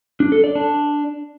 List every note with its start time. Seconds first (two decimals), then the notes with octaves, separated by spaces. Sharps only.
0.20 D4
0.32 A4
0.44 D5
0.55 D4